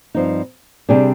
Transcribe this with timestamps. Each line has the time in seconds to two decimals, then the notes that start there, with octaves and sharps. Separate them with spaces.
0.15 G2 F3 C4 D#4
0.89 C3 G3 D4 G#4